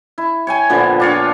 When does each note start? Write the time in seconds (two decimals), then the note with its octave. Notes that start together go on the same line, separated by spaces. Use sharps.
0.18 E4
0.47 C#5 G5 G#5
0.70 A#2 D3 F3 B3
1.00 D4 F4 C#5